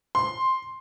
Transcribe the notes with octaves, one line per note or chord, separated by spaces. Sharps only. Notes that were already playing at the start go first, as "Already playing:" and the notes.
C6